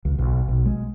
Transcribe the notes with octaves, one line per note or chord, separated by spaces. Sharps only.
C#2
B1
B1
G#3